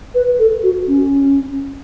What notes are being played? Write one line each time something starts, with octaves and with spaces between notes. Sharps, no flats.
B4
A4
F#4
C#4